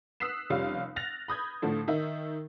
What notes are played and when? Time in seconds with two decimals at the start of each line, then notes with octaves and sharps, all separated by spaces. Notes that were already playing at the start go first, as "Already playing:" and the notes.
0.20 D#6 E6 F#6 B6 C7 E7
0.50 F1 G3 C#4 F4 F5
0.96 F6 F#6 A6 A#6 F7
1.28 B5 D#6 G6 G#6
1.62 A2 D3 F3 A3
1.88 D#3 D#4 E5